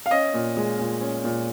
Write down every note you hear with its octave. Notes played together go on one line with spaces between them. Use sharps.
F5
C#4 D#5
A#2
G#3
A#2
C#4
A#2